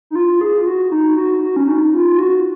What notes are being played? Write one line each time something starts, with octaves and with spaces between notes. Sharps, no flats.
D#4
F4
G#4
F4
F#4
D#4
F#4
F#4
C#4
D#4
F4
F#4